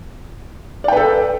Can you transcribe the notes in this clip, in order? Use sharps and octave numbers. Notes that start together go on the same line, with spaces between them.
A4 B4 D5 G5